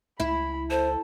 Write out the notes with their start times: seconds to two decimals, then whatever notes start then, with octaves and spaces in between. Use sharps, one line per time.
0.20 C#2 E4 B5
0.70 A4 C5